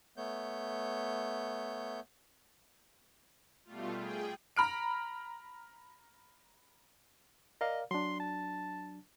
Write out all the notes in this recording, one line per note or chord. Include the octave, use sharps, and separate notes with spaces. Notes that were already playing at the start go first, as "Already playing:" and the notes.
A3 B3 C#5 G6
B2 G3 A3 F4
G#4 G5
A#5 B5 F6 D7
A#4 D5 D#5 F5
F#3 D4 C6
A5